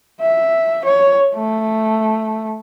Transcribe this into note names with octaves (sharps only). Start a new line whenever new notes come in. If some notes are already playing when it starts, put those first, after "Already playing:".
E5
C#5
A3